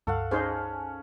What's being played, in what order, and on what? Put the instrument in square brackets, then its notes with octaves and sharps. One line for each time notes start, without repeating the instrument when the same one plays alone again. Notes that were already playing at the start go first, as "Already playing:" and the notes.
[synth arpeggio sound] C#2 G2 C#6 [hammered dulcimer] A4 F5 F#5
[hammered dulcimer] C#4 [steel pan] D#4 G#4 C5